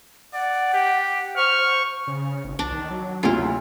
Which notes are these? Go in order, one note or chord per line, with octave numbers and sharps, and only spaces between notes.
D5 F#5
G4
C5 C#6 F6
C#3
G#1
C2 D4
D#3
F#3
F#1 D2 C3 E4 F4